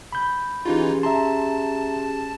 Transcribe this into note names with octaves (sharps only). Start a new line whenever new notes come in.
B5 G6
E3 C#4 D#4 F4 G4 G#4
E5 A5 A#5 C6